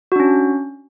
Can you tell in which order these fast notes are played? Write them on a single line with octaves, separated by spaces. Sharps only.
F#4 D4 C#4